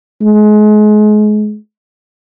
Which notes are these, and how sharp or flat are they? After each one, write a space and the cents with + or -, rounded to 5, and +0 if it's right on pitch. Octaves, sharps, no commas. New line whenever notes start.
G#3 +30